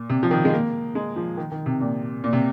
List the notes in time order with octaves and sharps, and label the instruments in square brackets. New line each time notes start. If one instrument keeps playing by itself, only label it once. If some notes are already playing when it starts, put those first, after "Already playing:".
Already playing: [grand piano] A#2
C3
F3
D#3
G#3
A#3
G#3
F3
D#3
D#3
C3
A#2
A#2
C3